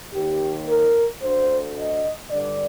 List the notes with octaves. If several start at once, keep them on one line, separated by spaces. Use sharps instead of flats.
D#2 D#3 G4
A#4
D2 D3 C5
D#5
G2 D3 D5